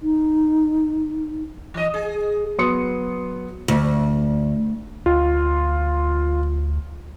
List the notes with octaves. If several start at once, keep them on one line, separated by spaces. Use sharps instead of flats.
D#4
E3 D#5
G#4
F#3 B3 C6 D#6 C#7
D2
D2 F4